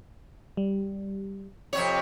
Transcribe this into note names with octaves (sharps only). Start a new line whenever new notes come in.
G3
F2 C3 C#5